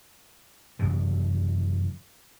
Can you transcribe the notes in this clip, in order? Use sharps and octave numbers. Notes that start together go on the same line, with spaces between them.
F#1 F#2 C3 E3